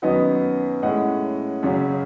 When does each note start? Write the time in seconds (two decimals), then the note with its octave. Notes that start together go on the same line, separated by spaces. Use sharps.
0.02 F#2 D#3 F#3 B3 B4 D#5
0.82 A2 G#3 C#4 D#5 F#5
1.63 F#2 C#3 F#3 C#4